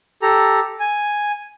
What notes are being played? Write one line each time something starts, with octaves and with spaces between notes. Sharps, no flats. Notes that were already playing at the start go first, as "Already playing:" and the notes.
G4 A4 A#5
G#5